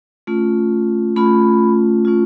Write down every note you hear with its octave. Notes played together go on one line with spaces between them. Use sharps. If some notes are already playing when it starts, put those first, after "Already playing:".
A3 C#4 F4
A3 C#4 F4 B5
A3 C#4 F4